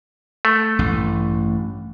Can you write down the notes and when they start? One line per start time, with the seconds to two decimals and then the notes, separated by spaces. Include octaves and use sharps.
0.45 A3
0.79 A1 G2